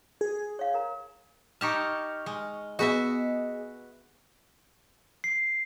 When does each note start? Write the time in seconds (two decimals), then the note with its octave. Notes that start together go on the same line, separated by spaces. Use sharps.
0.21 G#4
0.59 C#5 F5
0.74 A#4 A#5
1.61 D#4 G4 A5 C#6 F6
2.26 G#3
2.79 B3 F#4 G#4 B4 D#5 E5
5.24 C7